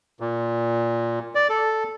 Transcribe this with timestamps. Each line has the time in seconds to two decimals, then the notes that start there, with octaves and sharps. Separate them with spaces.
0.20 A#2
1.35 D5
1.49 A4